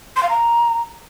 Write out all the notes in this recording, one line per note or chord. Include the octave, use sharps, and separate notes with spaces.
C6
F5
A#5